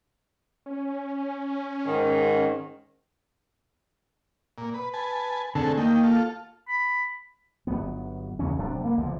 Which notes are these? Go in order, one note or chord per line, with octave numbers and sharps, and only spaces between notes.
C#4
G#2 D#3
A#2
B4
B4 G#5 A5
D3 A3 C4 D4 G#4 A4
D#2 D#3 A#3 G5
F4 A4
B5
G1 F#3 B3
D#2 C#3 E3 C#4
D1 C3 F#3 D4
A#3 B3
C#2 D3 E3 F3